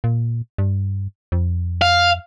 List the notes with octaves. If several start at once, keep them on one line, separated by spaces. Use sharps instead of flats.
A#2
G2
F2
F5